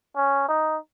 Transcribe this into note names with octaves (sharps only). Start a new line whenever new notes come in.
C#4
D#4